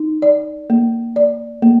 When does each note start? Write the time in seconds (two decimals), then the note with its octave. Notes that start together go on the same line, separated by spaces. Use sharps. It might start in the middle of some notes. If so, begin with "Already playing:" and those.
Already playing: D#4
0.22 D5
0.70 A#3
1.16 D5
1.62 A#3